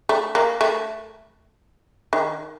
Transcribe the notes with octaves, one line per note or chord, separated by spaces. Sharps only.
A3
A#3
A3
D#3